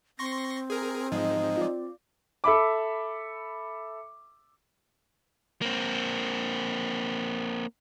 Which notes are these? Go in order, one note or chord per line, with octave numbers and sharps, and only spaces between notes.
C4 C6 C#6 A#6
G#4 A#4
G#2 F3 G#3 D#4 D#5
F4 D5
A4 E5 B5 D6
A#3 C4